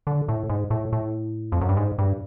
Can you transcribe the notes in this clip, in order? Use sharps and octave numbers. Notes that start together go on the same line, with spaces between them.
D3
A2
G#2
A2
A2
F2
F#2
G2
G#2
G2